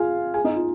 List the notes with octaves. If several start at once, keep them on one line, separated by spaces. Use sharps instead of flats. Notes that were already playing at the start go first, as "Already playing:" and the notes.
Already playing: F4 G#4 F5 G#5
G#4 G#5
D#4 D#5
F4